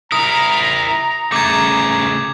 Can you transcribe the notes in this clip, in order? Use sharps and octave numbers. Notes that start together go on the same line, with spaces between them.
E4 A#4 A#5 D#6
C#3 A3 D6 G#6